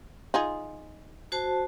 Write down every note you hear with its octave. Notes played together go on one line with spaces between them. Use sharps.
D#4 F4 G#4
F#4 C5 A5